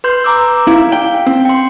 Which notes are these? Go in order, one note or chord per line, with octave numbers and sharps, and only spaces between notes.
B4 C6 G6
A#5 D6 E6
E4 F5
G5
C4
G5 C6